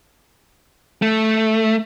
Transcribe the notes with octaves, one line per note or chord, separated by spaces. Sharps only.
A3